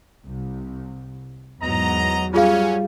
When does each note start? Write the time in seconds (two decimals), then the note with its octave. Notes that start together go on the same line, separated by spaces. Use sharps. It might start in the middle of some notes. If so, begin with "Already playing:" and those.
0.24 C2
1.62 E2 G#2 F#3 B3 D#5 A#5
2.34 F#3 G3 C#4 F4 G#4 F5